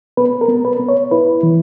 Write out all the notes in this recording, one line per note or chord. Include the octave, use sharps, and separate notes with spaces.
B3 B4
A#4
B3
B4
B3
C#5
E4 B4
E3